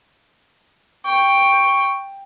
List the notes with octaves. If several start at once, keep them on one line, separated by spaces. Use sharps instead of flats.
G5 C#6